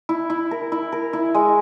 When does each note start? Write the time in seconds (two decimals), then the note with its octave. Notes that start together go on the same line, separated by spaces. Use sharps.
0.09 E4
0.30 E4
0.51 A#4
0.72 E4
0.92 A#4
1.13 E4
1.35 G#3